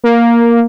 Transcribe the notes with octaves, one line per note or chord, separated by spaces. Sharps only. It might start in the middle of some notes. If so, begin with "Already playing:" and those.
A#3